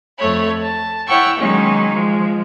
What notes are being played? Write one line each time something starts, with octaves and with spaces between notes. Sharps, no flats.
F2 A3 C#5 B5
A5
E4 C#5 F#5 G5 C#6 E6
D#3 F#3 G#3 A#3 C#4 D#4
F3 G#3